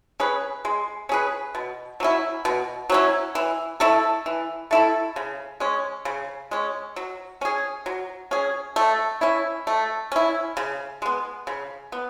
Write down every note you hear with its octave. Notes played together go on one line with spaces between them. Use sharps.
C#4 G#4 B4
G#3
C#4 G#4 B4
B2
F#3 C#4 E4
B2
F#3 C#4 E4
E3
A3 E4 A4
E3
A3 E4 A4
C#3
G#3 C#4
C#3
G#3 C#4
F#3
C#4 G#4
F#3
C#4 G#4
A3
C#4 E4
A3
C#4 E4
C#3
G#3 B3
C#3
B3